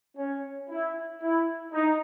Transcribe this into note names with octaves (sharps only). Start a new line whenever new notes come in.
C#4
E4
E4
D#4